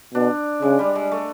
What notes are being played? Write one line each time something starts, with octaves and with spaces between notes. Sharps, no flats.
B2 D4
C#3 G#3
G3
G#3
A3